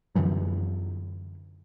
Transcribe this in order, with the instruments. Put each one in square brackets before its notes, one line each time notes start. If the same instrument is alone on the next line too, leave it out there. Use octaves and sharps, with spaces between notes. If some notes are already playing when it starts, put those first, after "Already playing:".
[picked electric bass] F#2 D3 E3 F#3